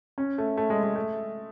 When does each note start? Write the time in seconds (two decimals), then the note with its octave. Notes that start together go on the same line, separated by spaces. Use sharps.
0.18 C#4
0.38 A3
0.57 A3
0.70 G#3
0.83 G#3
0.95 A3